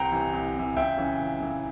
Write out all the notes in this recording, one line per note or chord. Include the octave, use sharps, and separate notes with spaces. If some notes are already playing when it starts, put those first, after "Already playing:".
Already playing: C2 G5 A#5
C3 E3
C2
C3 E3
C#2 E5 G5
C#3 E3
C#2
C#3 E3